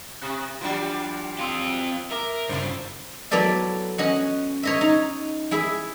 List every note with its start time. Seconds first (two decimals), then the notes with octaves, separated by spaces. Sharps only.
0.22 C3 F#6
0.61 E3 F#3 G3 D4 F4
1.40 C4 F4 C6 D#6 E6
2.11 A#4 E5 D6
2.49 G2 C#3 D4 E4 F4 C5
3.31 F#3 B3 E4 A4 D5 E5
3.98 C#4 D#5 F#5
4.63 C#5 D#5 E5
4.81 D#4
5.51 E4 G#4 E5